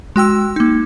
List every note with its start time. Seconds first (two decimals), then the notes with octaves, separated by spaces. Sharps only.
0.16 G#3 F#4 G5 E6
0.56 A#3 D#4